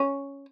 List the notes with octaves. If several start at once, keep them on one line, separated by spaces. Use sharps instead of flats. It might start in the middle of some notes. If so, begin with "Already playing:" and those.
Already playing: C#4